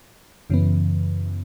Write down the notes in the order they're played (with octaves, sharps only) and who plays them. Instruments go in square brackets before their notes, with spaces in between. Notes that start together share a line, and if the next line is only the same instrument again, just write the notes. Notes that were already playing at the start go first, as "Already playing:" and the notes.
[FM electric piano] F#2 C#3 E3 B3